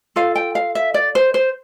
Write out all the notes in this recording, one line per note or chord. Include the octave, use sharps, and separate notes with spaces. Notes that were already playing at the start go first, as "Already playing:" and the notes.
F4 A4 F5
G5
F5
E5
D5
C5
C5